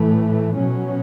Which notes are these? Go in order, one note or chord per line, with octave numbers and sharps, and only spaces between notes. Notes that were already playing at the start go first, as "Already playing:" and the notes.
Already playing: A2 E3 A3
B2 F#3 C#4